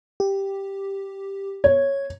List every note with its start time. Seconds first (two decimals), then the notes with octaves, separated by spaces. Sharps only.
0.20 G4
1.64 C#5 G#6